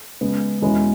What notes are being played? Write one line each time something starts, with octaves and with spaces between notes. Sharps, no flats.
C#3 G#3 B3
E2 B2 G#3 C#4 E4